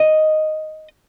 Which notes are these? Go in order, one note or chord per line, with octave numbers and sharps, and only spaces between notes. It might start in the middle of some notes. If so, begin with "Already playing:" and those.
Already playing: D#5